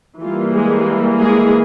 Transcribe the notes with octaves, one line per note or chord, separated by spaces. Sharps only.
E3 G3 A#3 F4
G#3 G#4
G#3 G#4